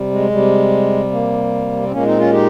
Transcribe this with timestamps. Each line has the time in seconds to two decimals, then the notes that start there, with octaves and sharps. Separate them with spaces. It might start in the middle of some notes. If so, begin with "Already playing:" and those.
Already playing: C3 G3
0.11 G#3
0.30 C3 G3
1.11 A#3
1.83 C4
1.92 A#2 G#3 A#3 C#4
2.05 C4 D#4
2.18 C#4 F4
2.32 D#4 G4